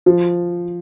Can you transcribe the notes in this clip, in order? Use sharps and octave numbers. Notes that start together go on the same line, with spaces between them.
F3